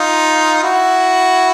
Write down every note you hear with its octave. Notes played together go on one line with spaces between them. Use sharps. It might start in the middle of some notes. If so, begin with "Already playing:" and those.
Already playing: D#4 F4
E4 F#4